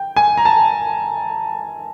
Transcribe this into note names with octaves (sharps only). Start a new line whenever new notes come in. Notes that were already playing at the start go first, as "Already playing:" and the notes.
Already playing: G5
G#5
A#5
A5